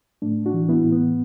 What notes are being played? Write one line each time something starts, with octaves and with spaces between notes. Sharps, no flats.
A2 A3 D4
D4 F#4
E3
B3 E4
A2
B3